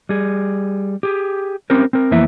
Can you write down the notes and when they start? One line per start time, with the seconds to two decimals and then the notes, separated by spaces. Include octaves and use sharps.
0.09 G3 G#4
1.03 G4 G#4
1.70 C4 C#4 G4 A#4 C5
1.93 C4 A#4
2.11 F2 E3 A#3 B3 E4 E5